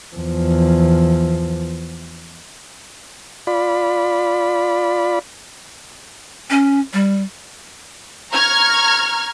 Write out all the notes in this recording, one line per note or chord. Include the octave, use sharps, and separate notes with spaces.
E2 F3
F4 D5 B5
C#4
G3
A#5 C#6 F6 G#6